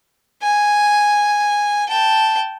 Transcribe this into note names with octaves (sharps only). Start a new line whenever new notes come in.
G#5
G5 A5